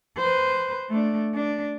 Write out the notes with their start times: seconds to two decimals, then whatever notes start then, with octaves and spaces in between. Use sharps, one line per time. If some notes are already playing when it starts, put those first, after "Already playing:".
0.17 B4 C5
0.89 A3 D4
1.35 D4